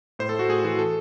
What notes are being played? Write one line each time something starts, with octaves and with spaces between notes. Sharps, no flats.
A2 C5
A4
A3
F#4
A2 G#4
E3 F#4
A4